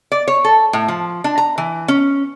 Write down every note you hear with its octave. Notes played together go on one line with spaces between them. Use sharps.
D5
C#5
A4
A2
F3
D4
A#5
E3
C#4